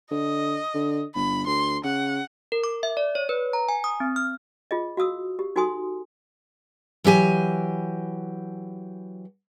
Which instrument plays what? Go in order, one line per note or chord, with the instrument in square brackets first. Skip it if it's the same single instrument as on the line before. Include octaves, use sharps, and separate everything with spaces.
[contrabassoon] D3 [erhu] D#5
[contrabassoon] D3
[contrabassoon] G1 [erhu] B5
[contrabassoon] D2 [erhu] C6
[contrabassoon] C#3 [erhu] F#5
[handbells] A#4
D6
E5
D5
C#5
B4
A#5
G#5
D#6
C4
F6
[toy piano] F4 G#4 D#5
F#4 F5 D#6 E6
G4
D#4 F#4 A4 G#5 C6 D#6
[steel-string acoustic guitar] E3 F#3 G4 G#5